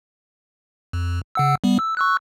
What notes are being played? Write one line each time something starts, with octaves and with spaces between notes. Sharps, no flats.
F2
C#3 F#5 E6
G3 B3
E6
C#6 E6 F#6